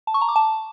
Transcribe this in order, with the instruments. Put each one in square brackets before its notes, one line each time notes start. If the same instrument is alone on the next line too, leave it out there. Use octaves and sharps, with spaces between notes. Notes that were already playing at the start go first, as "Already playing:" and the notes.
[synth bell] A5
C#6
A#5
D6
A5